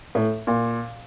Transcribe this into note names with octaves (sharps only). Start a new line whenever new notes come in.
A2
A#2